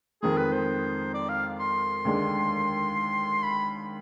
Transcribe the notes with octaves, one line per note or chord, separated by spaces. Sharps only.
F2 D#3 G#3 G#4
B4
C5
D5
F5
C6
D#2 D3 G#3 D4
B5